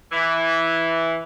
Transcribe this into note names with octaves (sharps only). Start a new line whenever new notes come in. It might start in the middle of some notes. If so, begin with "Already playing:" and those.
E3